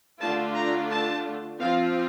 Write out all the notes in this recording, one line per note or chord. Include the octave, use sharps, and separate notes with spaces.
D3 A3 D4 F4 A5
A#5
A5
F3 C4 F4 F5